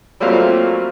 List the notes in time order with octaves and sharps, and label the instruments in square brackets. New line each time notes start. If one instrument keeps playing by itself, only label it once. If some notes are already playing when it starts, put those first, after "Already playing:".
[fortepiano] F#3 G3 A3 A#3 C4 F4